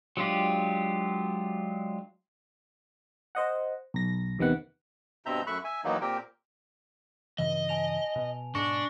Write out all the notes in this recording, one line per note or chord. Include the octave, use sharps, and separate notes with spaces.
F#3 G#3 D4 F4 G4
C5 D#5 F#5
B1 A#6
E2 C3 D#3 B3 F#5
G2 B2 C4 E5 A#5 G6
F#2 A3 E5 B5 C#6 F#6
E5 G#5
E2 D#3 F#3 A#3 B3 D#4
A#2 C4 G4 A#4 G5
G2 C#3 E3 D#5
G#5 A5 F7
B2
G#2 B2 D4 C#6 A#6 C#7